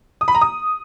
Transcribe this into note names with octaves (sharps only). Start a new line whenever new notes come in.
D#6
B5
A#5
D#6